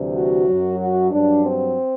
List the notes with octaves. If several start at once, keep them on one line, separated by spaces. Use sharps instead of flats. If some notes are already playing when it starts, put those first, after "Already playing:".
Already playing: D2 C3 E3 G3
F#4
F#2 F#3
F#4
G2 F#3 D4
C4